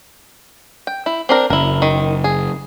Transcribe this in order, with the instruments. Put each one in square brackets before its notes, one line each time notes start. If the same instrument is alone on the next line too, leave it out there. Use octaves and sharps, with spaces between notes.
[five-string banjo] G5
E4
C4 D4 A#4
[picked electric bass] F#1 [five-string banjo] E4 A#4
[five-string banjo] D#3
G#4